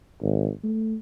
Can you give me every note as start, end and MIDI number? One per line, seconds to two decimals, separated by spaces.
0.22 0.50 32
0.64 0.96 57